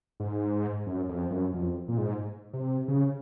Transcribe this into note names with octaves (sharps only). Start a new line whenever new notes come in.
G#2
F#2
F2
F#2
F2
A#2
G#2
C3
C#3